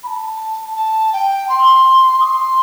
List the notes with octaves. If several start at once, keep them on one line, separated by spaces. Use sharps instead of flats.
B5
A5
A5
G5
C6
D#6
C6